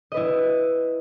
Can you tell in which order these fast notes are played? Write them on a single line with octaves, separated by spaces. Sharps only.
D#5 B4 E4